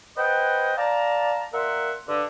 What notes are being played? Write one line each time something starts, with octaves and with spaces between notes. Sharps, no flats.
B4 C5 D#5 F#5 G5
D5 F5 A5 A#5
A#2 A#4 E5 F#5 C6
G2 D3